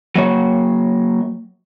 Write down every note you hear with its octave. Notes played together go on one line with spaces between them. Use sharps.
F#3 A#3 C#5